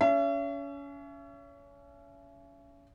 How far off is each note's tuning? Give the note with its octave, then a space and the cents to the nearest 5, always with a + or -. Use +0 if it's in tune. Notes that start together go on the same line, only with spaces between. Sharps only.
C#4 +30 E5 +40